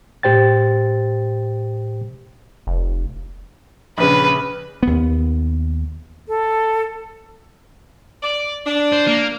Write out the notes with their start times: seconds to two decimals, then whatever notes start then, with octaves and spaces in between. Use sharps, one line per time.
0.23 A2 G4 C5 G5 A6
2.67 F1
3.98 A#1 C#3 B4
4.83 D#2 B3
6.28 A4
8.22 D5
8.65 D4
8.92 C5
9.07 A#3